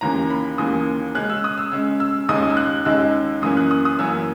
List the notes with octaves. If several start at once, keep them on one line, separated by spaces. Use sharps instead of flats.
D#2 C#3 E3 A#3 A#5
B5
D#2 C#3 E3 A#3 D#6
C#3 G#3 C#4 F#6
E6
D#6
E6
C#3 G#3 C#4 E6
E6
D#2 C#3 G#3 D#4 D#6
D#6
E6
F#6
D#2 C#3 G#3 D#4 E6
F#2 E3 A#3 C#4 D#6
F#6
D#6
D#6
F#2 E3 A#3 C#4 E6